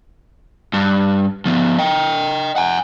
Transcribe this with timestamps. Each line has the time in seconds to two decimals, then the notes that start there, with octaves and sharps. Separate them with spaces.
0.73 G2
1.46 F3 B3
1.79 D#5 G5
2.56 F#5 G#5